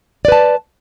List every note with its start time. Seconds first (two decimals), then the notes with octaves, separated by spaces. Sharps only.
0.25 D5
0.28 B4
0.32 A5